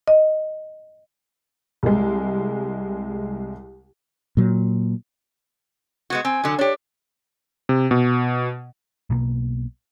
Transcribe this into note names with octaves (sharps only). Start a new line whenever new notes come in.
D#5
C2 G#3
A#2 F#3
G#3 B3 F#4 G#6
C4 G#5
D3 F#3
D4 G4 C#5
C3
B2
B1 B2 A#3